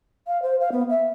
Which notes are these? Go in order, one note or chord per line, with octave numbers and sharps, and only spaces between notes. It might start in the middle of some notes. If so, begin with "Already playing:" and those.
F5
C5
F5
B3
E5